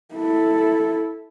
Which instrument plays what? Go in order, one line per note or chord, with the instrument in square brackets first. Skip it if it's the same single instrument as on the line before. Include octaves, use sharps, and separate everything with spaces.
[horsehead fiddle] E4 A4